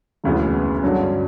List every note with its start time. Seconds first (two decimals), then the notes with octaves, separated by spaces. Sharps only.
0.24 E1 D2 C#3 E3 B3
0.82 G2 D3 F#3 C#4